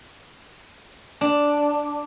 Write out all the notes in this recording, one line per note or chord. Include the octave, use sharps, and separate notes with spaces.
D4